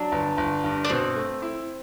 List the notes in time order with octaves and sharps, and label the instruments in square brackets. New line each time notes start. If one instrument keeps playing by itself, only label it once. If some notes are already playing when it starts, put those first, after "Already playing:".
Already playing: [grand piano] F#3 [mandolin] D4
[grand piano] G1
G1
G2
[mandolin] D4
[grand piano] B2 [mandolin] C4
[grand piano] A3
E4